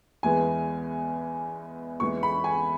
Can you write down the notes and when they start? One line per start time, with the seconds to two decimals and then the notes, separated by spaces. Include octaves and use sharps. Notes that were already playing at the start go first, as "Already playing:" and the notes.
0.23 E2 E3 G#3 B3 G#5
2.00 E2 E3 G#3 C#6
2.23 B5
2.44 G#5